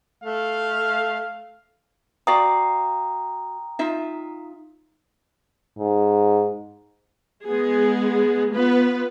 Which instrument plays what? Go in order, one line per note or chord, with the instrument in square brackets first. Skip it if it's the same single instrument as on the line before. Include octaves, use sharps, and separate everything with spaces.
[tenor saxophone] A3 [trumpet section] F5
[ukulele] F#4 D5 F5 [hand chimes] G5 A#5 D#6
[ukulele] D#4 F4 E5
[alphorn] G#2
[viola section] G#3 B3 G#4
B3 F4 B4